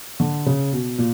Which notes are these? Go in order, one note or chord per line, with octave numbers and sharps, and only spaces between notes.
D3
C#3
B2
A#2